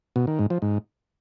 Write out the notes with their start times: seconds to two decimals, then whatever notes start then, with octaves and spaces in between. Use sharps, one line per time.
0.16 B2
0.27 D#3
0.39 G#2
0.50 F3
0.62 G#2